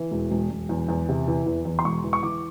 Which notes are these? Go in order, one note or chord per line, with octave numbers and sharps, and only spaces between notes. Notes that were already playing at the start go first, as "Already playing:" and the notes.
Already playing: E3
E1
E1
E1
E2
E2
C3
E3
E2
E2
C6
E1 C#6
E3
C#6
E3 D6